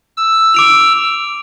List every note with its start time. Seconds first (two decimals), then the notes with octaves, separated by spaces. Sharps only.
0.17 E6
0.54 D6 D7 F7